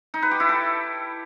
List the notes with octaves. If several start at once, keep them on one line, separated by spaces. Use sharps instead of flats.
D#4
B4
G4
E4
A4